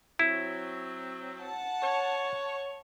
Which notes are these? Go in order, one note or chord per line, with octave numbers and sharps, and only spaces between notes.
F#3 C4 E4
F#5 A5
C#5